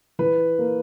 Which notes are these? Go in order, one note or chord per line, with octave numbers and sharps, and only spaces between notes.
E3 B4
A#3